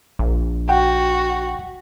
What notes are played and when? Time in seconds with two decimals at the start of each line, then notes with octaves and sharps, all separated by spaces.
0.19 A#1
0.69 F#4 F#5 G5